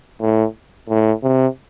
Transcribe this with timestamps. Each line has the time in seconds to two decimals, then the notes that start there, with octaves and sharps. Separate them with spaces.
0.21 A2
0.89 A2
1.23 C3